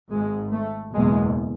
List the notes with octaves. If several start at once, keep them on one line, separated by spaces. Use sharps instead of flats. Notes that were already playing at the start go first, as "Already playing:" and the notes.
G#1 G#2 G#3
A3
F#1 E2 B2 G#3